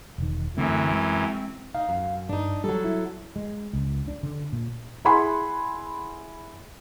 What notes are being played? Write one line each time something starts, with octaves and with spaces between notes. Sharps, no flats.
E1 D#3
F#2 D3 E3 A3 C4
G#3
D#4 F5
F#2
G2 D4 D#4
F#3 G3 A4
E4
G#3
C#2
D4
D3
A#2
E4 G#4 F#5 G#5 B5 C6